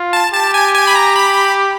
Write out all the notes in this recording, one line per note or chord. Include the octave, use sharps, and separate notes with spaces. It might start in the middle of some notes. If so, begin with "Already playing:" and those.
Already playing: F4
A5
G4 A5
G#5
G#5
B5
A#5
B5